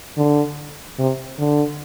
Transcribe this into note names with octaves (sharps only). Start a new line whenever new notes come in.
D3
C3
D3